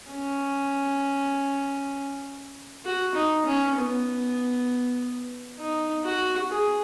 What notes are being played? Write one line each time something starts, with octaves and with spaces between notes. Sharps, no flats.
C#4
F#4
D#4
C#4
B3
D#4
F#4
G#4